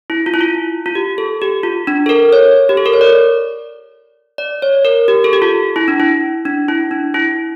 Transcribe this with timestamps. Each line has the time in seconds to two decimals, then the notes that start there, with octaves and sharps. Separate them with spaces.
0.10 E4
0.26 F4
0.34 E4
0.41 F4
0.86 F4
0.95 G4
1.18 A4
1.42 G4
1.63 F4
1.87 D4
2.06 A4
2.09 A#4
2.33 C#5
2.69 G4
2.77 A4
2.86 A#4
2.93 C#5
3.01 D5
4.38 D5
4.62 C#5
4.85 A#4
5.08 G4
5.24 A4
5.33 G4
5.42 F4
5.76 E4
5.88 D4
6.00 E4
6.45 D4
6.69 E4
6.91 D4
7.14 E4